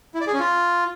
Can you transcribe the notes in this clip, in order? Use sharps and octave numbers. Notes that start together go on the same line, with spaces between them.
E4
D5
G#4
C#4
F4